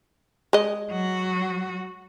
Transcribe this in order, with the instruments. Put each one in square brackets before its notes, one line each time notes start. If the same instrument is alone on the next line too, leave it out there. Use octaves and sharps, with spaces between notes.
[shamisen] G#3 D#5
[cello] F#3 F#4